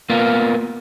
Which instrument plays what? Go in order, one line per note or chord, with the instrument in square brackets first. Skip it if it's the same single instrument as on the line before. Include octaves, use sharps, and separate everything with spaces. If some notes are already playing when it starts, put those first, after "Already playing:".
[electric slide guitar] A#3 B3 F4